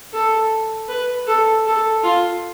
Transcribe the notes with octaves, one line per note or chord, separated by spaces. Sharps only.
A4
B4
A4
A4
F4